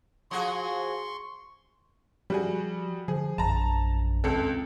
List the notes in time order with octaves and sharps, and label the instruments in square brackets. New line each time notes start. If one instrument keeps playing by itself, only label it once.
[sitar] F3 F#4 G#4 [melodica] C6 C#6
[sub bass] F3 [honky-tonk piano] G3 F#4 G#4
[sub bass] D3 [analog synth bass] F3 [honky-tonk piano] G#4
[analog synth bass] A#1 [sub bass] F#2 [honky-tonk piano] A5 A#5
[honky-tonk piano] C#2 A4 [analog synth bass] C4